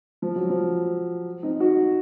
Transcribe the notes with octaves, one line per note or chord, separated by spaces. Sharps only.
F3
F#3
F3
C4 D#4
D#4 F#4